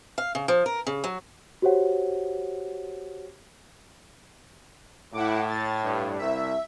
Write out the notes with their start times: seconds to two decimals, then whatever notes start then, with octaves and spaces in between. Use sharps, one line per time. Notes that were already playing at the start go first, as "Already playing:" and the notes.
0.18 F5
0.35 C#3
0.48 F3
0.66 A#4
0.87 C#3
1.04 F#3
1.62 F#4 G4 C5 C#5 F#5
5.14 A2 E4 F#5 D6
5.47 A6
5.83 G2
6.19 C2 E5